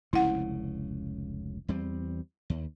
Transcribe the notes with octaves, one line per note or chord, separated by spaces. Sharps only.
F1 C#2 C#3 E4 F#5
E2 G3 C4
D#2